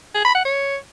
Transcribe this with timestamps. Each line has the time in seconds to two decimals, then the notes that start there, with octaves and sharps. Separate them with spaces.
0.15 G#4
0.25 B5
0.35 F#5
0.45 C#5